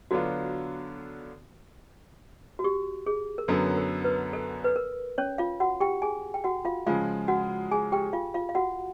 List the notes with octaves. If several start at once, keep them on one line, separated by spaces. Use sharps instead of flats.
D3 F#3 B3 D4 F4 F#4
F#4
G4
G#4
A#4
F#2 D3 F#3 B3 A4
A#4
B4
A4
B4
A#4
C#4 C#5
F4 F5
F#4 F#5
G4 G5
G#4 G#5
G5
F#4 F#5
F4 F5
C#3 F3 G#3 F4 F5
F#4 F#5
G#4 G#5
G4 G5
F4 F5
F4 F5
F5
F#4 F#5